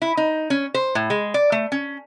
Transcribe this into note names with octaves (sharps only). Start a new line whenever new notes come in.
E4
D#4
C#4
C5
A2
G#3
D5
A3
C#4